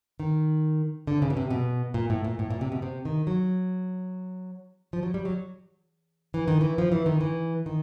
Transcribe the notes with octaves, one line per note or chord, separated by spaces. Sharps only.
D#3
D3
C#3
B2
C3
B2
A#2
A2
A#2
A2
A#2
C3
B2
C3
D#3
F#3
F3
F#3
G3
F#3
E3
D#3
E3
F3
E3
D#3
E3
D#3